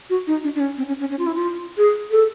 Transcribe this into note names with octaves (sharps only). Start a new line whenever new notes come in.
F#4
D#4
D4
D4
C#4
C4
C#4
C#4
C#4
F4
E4
F4
G#4
A4